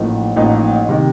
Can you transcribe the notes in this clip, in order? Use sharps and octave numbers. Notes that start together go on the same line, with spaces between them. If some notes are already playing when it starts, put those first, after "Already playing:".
Already playing: A1 A2 F3 A#3 D#4
A1 A2 F3 A#3 D#4
C3 D#3